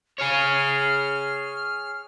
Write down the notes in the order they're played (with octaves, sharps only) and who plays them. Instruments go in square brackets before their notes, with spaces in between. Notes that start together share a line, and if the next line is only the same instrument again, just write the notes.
[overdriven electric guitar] G#4 C#5 [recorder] F6